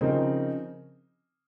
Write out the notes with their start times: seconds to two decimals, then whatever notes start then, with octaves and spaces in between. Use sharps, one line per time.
0.01 C#3 F3 C4 D#4 A#4